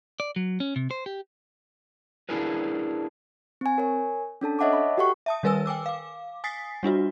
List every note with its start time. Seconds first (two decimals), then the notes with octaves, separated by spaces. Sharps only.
0.20 D5
0.36 F#3
0.60 C#4
0.76 C3
0.91 C5
1.06 G4
2.29 D4 E4 G#4 A#4 B4
3.61 C4 G#5
3.78 A#4 C#5 G#5
4.41 C#4 D4 A4 A5
4.59 C#5 D#5 E5 F#5 A5 D6
4.73 F#5 B5
4.97 F#4 G4 A4 F#5 G5 C#6
5.26 E5 A5 D#6
5.43 D#3 G3 A#4 B4 G#5 E6
5.66 G5 G#5 D6 E6
5.86 F5 D6
6.44 G#5 D#6 A6 B6 C7
6.83 G3 D4 F4 F#4